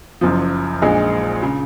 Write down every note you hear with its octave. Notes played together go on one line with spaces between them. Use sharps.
F#1 F#2 F3
A#1 A#2 G#3 D#4 G#4
C#3